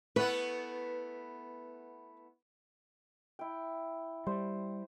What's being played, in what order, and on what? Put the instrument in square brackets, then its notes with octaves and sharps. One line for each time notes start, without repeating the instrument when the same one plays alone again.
[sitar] A3 B3 E4 [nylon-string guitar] B4
[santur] E4 G5
[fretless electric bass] G3 [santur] C5